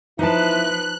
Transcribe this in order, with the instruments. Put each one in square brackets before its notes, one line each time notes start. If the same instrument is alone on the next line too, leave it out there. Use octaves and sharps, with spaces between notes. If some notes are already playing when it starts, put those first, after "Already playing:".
[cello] F3 B4 [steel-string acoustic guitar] D#4 A5 [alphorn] E4 [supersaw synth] F#6